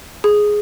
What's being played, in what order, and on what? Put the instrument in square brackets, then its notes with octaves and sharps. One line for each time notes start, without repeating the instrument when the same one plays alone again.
[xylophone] G#4